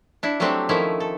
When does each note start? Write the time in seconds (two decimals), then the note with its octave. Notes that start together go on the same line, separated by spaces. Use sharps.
0.23 D4 E4
0.40 F#3 G3 A3 C4 D4 A4
0.69 D#3 F3 A3 C#4 E4
1.00 A4